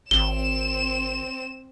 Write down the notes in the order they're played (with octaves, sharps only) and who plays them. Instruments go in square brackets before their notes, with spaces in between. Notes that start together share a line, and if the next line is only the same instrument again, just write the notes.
[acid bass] G#1 [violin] C4 E7 [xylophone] G7